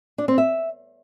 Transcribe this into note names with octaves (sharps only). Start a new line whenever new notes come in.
D4
C4
E5